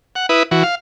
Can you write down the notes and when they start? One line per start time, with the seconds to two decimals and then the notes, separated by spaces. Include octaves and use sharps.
0.15 F#5
0.29 E4 B4 D#6
0.51 E3 F#4
0.63 F5